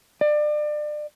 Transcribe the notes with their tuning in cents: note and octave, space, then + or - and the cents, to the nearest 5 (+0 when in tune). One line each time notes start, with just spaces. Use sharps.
D5 +30